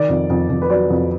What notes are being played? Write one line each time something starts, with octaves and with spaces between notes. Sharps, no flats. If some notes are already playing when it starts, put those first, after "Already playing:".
Already playing: D#3 D5
F2
F2
F2
B4
F#3 D5
F2